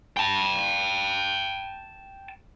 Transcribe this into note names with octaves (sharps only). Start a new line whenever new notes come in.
G5 A5